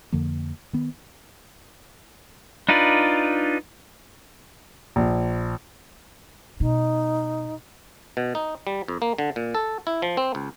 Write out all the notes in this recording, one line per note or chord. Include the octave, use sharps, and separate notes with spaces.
F2 D3 F3 A#3
D#3 B3
D4 D#4 F4 B4 D5
A#1
B2 D#4
B2
D#4
G3
F2
A#3
D3
A#2
A4
E4
F3
C4
C#2